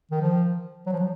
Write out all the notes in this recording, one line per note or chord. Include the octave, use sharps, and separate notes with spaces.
D#3
F3
F#3
F3
F#3